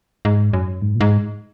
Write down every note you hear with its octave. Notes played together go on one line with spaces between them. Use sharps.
G#2
F#2
G#2
A#2
G#2